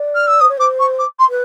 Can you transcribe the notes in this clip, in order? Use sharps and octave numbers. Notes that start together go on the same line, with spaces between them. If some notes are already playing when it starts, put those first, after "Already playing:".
Already playing: D5
F6
E6
C5 D#6
C#5
C5 D6
C#6
D6
C6
B4